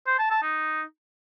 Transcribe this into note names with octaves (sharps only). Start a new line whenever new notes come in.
C5
A5
A5
D#4